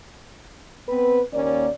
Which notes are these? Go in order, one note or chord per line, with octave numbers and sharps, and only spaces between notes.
B3 C4 B4
D#2 A#3 C#4 D5